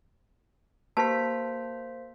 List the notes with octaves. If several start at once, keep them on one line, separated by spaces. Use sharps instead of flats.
A#3 G4 B4 C5 A5 B6